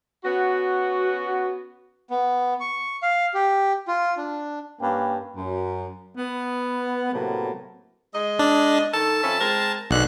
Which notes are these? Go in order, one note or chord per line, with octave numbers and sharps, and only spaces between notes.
B3 C#4 F#4
B3
C#6
F5
G4
F4
D4
G2 A#3 C#4 B4 G5
F#2
B3
A2 C3 F#3 A#3 B3
G#3 D#5
D4
D#3 A4 A5
F2 C#4 E5
G#3 C4 A#4
B1 G#2 B2 D3 F#6